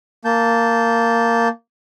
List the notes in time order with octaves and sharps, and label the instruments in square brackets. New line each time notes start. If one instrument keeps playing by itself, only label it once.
[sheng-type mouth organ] A#3 A5 G6